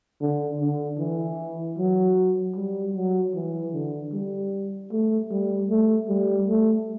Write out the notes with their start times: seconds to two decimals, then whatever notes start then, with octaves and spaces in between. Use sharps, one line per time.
0.21 D3
0.60 D3
0.99 E3
1.78 F#3
2.56 G3
2.95 F#3
3.34 E3
3.73 D3
4.13 G3
4.91 A3
5.31 G3
5.70 A3
6.09 G3
6.48 A3